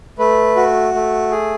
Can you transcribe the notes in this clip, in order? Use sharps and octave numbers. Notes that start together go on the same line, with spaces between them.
A3 B4
F#4
A3
G#4